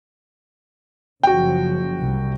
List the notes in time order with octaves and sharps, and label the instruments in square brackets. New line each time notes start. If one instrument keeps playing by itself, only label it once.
[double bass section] F#1 C#3 F3 [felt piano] F#4 G5
[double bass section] C2